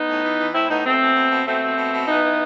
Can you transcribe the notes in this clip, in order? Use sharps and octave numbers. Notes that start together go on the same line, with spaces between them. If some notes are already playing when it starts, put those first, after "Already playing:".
Already playing: B3 D#4
A2
E3
E3
A2 C4 E4
A2 B3 D#4
B2 A3 C4
B2
B2
B2
B2 A3 C4
B2
B2
B2
E3 B3 D#4
E3